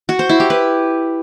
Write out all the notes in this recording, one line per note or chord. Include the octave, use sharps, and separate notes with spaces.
F#4
C5
E4
G4
B4